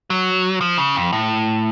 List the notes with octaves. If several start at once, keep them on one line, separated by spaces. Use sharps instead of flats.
F#3
F3
C#3
F2
A2